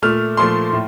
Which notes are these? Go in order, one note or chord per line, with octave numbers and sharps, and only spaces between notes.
A#2 A3 F6
A#2 F3 A3 C6
A2